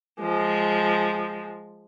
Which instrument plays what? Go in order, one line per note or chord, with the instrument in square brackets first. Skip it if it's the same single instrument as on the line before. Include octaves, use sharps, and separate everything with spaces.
[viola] F3 G#3